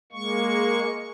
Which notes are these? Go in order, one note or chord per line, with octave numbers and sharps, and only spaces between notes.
G#3 A#3 C#6